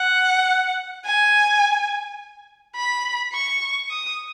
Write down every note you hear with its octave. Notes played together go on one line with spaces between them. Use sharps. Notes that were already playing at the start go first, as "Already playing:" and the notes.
Already playing: F#5
G#5
B5
C#6
D#6